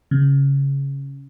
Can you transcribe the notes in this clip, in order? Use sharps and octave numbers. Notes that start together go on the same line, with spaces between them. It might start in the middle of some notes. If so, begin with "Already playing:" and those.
C#3